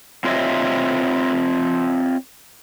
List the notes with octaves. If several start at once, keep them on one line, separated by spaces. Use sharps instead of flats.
C4 F4 C5 C#5 D#5 E5